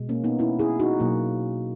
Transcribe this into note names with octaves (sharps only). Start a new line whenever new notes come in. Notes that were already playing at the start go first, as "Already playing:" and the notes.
Already playing: B2 G#3
A#3 C#4
B3 D#4
C#4 E4
E4 G#4
D#4 F#4
B2 F#3 A#3